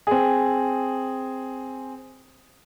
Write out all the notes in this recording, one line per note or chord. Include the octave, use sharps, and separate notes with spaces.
C4 G#4